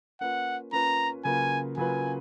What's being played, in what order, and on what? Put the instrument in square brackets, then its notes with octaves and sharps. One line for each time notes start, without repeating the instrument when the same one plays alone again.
[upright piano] A#3 C#4 F4 B4 [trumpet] F#5
[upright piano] A#3 C#4 F4 B4 [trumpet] A#5
[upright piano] C#3 F#3 A#3 F4 B4 [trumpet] G#5
[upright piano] C#3 F#3 A#3 F4 B4 [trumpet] G#5